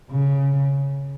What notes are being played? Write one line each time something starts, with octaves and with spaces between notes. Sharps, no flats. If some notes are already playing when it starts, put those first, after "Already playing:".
C#3